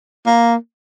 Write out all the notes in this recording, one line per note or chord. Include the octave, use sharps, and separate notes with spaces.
A#3